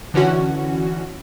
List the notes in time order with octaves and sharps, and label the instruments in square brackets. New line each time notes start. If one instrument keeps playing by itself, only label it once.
[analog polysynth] D3 E3 C#4 F#4